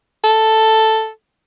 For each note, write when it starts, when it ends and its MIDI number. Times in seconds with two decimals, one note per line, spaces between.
0.24 1.09 69